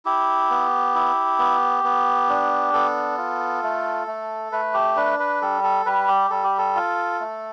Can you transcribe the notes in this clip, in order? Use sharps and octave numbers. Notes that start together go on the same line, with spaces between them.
E4 G4
B3
E4
B3
B3
D4
B3 A4
F4
A3
A3
A3 B4
G4
D4 B4
B4
G3 A4
A4
G3 B4
G4
G3 A4
G4
A4
F4
A3